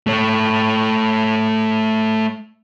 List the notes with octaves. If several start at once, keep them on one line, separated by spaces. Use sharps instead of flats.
A3 C#5